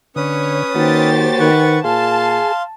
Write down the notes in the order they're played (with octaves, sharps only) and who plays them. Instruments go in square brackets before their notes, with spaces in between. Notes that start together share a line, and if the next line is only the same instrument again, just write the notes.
[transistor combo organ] D3 [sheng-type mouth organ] C#4 B4 D#6 [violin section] C#5
[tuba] D#3 [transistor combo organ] A#3 F#4 C#5 [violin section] G4 C5 A6
[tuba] D#3 [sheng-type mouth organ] B4 F#5 C#6
[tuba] A#2 [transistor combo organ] G#4 [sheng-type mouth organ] F5 C6 [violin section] A5